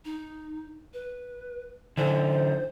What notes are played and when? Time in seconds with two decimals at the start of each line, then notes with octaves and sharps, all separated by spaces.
0.05 D#4
0.94 B4
1.97 D3 E3 D4 C5